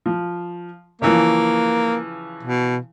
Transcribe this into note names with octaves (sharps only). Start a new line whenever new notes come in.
F3
C#3 E3 F3 A#3
B2